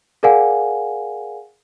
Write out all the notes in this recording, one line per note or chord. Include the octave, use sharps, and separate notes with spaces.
G#4 A#4 D5 F5 F#5 G#5